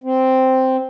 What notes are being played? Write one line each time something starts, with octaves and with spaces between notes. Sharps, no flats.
C4